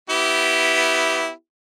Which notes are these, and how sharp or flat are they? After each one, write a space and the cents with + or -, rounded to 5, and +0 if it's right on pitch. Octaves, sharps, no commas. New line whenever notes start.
B3 +0 E4 -10 G4 -20